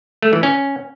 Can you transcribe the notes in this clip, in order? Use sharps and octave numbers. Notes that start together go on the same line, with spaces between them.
A3
E3
C#4